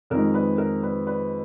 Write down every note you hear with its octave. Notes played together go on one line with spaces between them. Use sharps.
F2 D#3 G#3 A#4
B4
A#4
B4
B4